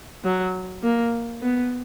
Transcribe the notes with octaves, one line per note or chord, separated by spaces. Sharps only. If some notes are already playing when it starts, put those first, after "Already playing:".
F#3
A#3
B3